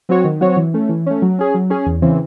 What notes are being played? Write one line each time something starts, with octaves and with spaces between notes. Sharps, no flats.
F#3 C4 F#4 C#5
D#3
F#3 C4 F#4 C#5
E3
A3 C#4
E3
A3 C#4
F#3
C#4 G#4
F#3
C#4 G#4
E2
C#3 E3 C4